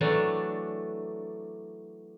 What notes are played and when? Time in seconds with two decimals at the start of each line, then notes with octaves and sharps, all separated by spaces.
0.01 E3 F#3 A3 D4